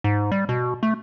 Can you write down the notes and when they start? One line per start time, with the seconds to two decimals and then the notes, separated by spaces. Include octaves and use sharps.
0.04 G#2
0.32 G3
0.49 B2
0.83 A3